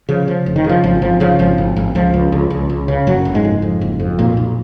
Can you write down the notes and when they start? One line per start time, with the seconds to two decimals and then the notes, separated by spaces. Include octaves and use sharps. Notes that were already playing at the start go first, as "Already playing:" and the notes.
0.09 C#3 F3
0.27 C#3 F3
0.46 F1
0.56 D#3
0.64 C#3 F3
0.84 G#1 F3
1.02 G#1 F3
1.20 C#3 F3
1.39 G#1 F3
1.58 G#1
1.76 G#1
1.95 C#2 F3
2.14 C#2
2.32 C#2
2.50 C#2
2.69 C#2
2.88 C#3
3.07 F#1 F#2 F#3
3.25 F#1
3.35 G#2 G#3
3.45 F2
3.62 F2
3.81 F#1
4.00 F2
4.18 B1 A#2 A#3
4.37 B1